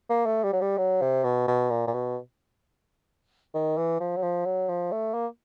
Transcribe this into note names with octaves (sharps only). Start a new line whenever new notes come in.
A#3
A3
G3
F#3
G3
F#3
C3
B2
B2
A#2
A#2
B2
D#3
E3
F3
F#3
F3
F#3
F3
A3
A#3